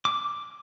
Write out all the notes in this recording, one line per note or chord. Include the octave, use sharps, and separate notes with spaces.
D6